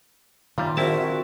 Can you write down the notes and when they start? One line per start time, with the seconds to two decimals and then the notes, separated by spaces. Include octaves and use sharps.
0.58 A#2 D#3 G3 F4
0.77 A#1 C4 E4 F#4 A5